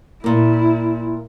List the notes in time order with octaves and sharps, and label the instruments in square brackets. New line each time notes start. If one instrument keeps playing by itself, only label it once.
[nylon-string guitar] A#2 A#3 [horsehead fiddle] E4